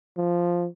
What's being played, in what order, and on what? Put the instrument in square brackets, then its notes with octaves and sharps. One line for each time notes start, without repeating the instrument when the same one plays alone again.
[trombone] F3